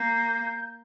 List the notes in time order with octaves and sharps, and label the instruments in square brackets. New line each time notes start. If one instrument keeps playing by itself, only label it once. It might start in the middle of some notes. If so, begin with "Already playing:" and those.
Already playing: [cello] A#3 [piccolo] G6